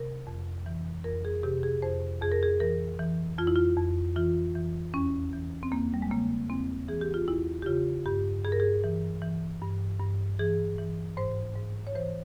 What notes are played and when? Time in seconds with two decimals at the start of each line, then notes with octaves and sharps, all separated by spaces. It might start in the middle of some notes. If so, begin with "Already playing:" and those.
Already playing: C3 A#4
0.27 F2
0.66 E3
1.04 F2 A#4
1.25 G#4
1.43 C3 G4
1.63 G#4
1.82 F2 C5
2.21 F2 G#4
2.32 A#4
2.43 G#4
2.60 E3 A#4
2.99 E3
3.38 F2 F4
3.47 E4
3.56 F4
3.77 F2
4.16 E3 F4
4.56 E3
4.94 E2 C#4
5.33 E3
5.63 C4
5.72 E2 A#3
5.94 G3
6.02 G#3
6.11 C#3 A#3
6.50 E2 C4
6.88 E3 G#4
7.01 G4
7.14 F4
7.28 E2 E4
7.62 G4
7.66 C#3 F4
8.06 G2 G4
8.45 G2 G#4
8.52 A#4
8.60 G#4
8.84 E3
9.22 E3
9.61 G2
10.00 G2
10.39 E3 G#4
10.78 E3
11.17 G#2 C5
11.55 G#2
11.87 C#5
11.95 E3 C5